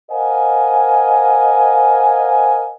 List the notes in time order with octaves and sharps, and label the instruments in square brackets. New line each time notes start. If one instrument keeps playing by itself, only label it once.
[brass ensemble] A#4 C5 D#5 F5 F#5 G#5